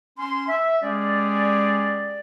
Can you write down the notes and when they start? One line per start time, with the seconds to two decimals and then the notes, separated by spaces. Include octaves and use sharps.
0.18 C#4 C6
0.48 E5
0.82 G#3 C#4 G4 G#4 D5